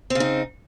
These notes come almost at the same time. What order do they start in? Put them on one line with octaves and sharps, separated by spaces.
C4 C#3 D#4